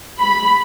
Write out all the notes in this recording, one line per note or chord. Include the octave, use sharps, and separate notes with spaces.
B5